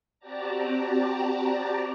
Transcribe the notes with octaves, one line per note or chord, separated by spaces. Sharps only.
C4 F#4 G4 D5 A5 A#5